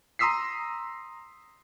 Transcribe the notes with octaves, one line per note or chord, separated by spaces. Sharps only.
A#5 C6 D#6 E6 B6 C7